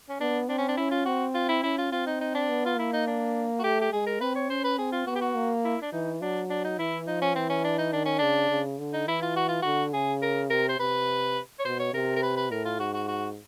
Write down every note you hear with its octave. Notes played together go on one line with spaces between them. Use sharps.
C#4
B3 D4
C4 D4
C#4
D4
C#4 E4
F4
C4 F#4
F4
E4
C#4 E4
F4
C4 F4
D#4
D#4
D4
B3
F4
A#3 E4
D#4
D4
F#4
A3 G4
G4
G#3 G#4
A#4
C4 B4
C#5
C#4 C5
B4
C4 G#4
F4
B3 F#4
G4
F#4
A#3
E4
D4
E3 D#4
F#3 D4
D4
D#4
E3 E4
F3 D#4
C#4
E3 C4
C#4
D4
D#4
D#3 D4
C#4
C#3 D4
C#3
D3
D#4
E3 E4
F4
F#4
F4
D3 F#4
C#3 G#4
A#4
C3 A#4
C5
C3 B4
C#5
B2 C5
C#5
C3 A#4
A#4
B4
B4
A2 A#4
F4
G#2 F#4
F#4
F#4